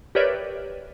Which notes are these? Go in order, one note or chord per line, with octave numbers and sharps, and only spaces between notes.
G4 A#4 B4 C#5 D5 E5